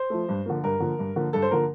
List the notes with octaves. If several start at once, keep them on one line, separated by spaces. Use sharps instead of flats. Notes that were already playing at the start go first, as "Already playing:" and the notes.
Already playing: C5
F3 A3
G2
D3 F3 A#3
G2 A#4
D3 F3 A#3
G2
D3 F3 A#3
G2 A4
C5
D3 F3 A#3 A#4